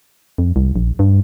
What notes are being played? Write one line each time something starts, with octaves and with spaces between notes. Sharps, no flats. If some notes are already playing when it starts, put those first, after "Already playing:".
F2
C2
A#1
G2